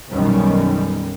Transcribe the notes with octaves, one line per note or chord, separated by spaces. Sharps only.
B1 F#2 D#3 G3 B3